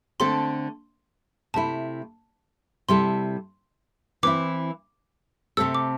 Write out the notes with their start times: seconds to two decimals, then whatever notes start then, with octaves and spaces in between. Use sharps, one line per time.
0.20 D3 A3 C4 A4 C6
1.54 C3 A3 E4 A5
2.89 C3 G3 E4 A4 C6
4.23 E3 C4 E4 D6
5.57 C3 A3 C4 A4 E6
5.75 D6